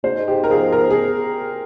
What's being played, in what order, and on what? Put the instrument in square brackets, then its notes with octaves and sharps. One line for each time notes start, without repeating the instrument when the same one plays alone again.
[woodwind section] G#2 [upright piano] C5
[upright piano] G4
A#4
[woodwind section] F3 [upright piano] G#4
[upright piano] A#4
G#4